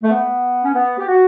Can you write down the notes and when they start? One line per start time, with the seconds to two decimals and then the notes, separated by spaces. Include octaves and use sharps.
0.02 A3
0.10 B3
0.63 C#4
0.74 B3
0.98 G4
1.07 F#4